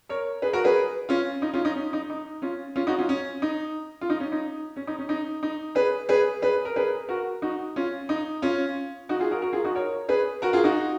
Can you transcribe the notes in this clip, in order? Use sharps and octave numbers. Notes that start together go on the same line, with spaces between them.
A#4 C#5
G#4 B4
F#4 A#4
G#4 B4
C#4 F4
D#4
C#4 F4
D#4
C#4
D#4
D#4
C#4 F4
C#4 F4
D#4 F#4
C#4 F4
C#4
D#4
F4
D#4
C#4
D#4
C#4
D#4
C#4
D#4
D#4
G#4 B4
G#4 B4
G#4 B4
A#4
G#4 B4
F#4 A#4
D#4 F#4
C#4 F4
D#4
C#4 F4
D#4 F#4
F4 G#4
F#4 A#4
F#4 A#4
F4 G#4
D#4 F#4
A#4 C#5
G#4 B4
F#4 A#4
F4 G#4
D#4 F#4